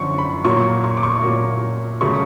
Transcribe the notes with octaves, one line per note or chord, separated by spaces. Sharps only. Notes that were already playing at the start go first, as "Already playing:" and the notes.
Already playing: F#2 D3 F3 C#6
B5
A#2 F#3 A#3 C#6
C#6
D6
C#6
A#2 F#3 A#3
C#3 F#3 A3 C#6